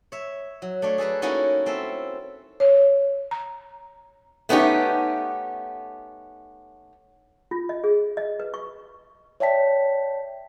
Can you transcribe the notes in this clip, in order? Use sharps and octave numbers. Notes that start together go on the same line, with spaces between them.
C#5 E5
F#3
A3 D4 C#5
G#4 A4 B4 A#5
A#3 C#4 D#4 E4 F#4 A4
C4 C#4 A4 E5
C#5
A#5
A3 B3 C#4 D#4 G4
F4
D#5
G#4
D#5
B4
C#6
C#5 D5 E5 G5 A5 B6